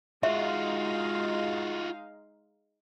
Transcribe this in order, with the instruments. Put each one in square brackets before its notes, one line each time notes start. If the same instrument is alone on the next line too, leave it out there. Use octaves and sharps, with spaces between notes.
[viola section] G#3 D#4 F5 [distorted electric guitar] F4 F#4 [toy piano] E5